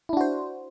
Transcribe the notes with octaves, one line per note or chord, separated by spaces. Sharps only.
D4 E4 F#4 C5